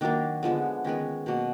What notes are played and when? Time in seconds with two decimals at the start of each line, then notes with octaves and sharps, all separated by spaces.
0.01 D#3 F#3 A#3 D4
0.43 D3 F3 G#3 B3
0.84 D#3 G#3 B3 C#4
1.26 B2 F#3 A#3